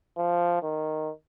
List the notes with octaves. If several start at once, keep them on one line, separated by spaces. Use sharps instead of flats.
F3
D#3